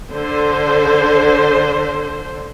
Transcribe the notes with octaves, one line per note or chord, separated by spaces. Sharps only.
D3 C5